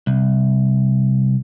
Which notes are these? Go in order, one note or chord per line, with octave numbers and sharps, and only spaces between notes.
C2